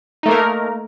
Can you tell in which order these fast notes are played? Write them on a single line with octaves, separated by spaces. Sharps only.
D#4 A3 A#3 A#4